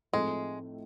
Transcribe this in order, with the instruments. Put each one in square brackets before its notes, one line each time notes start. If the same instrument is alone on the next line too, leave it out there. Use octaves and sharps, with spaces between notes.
[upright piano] A2 F3 A3 C4 D#4 [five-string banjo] G#3